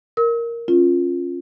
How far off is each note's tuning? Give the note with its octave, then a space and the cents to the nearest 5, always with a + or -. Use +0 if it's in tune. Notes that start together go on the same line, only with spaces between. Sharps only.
A#4 +0 E6 -45
C#4 -20 F4 +0